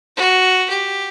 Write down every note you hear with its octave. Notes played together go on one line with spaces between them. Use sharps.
F#4
G4